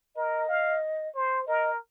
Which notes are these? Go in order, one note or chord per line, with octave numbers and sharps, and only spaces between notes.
A#4 D#5
F5
C5
A#4 D#5